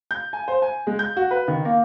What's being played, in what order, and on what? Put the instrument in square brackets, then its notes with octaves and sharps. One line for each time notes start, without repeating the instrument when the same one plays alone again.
[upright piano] G6
G#5
C5
G#5
G#3
G6
F#4
B4
D#3
A#3